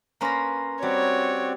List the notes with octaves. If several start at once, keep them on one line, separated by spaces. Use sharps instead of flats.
A#3 C#4 B4 A#5 C6 A#6
G3 C4 F#4 C#5 D5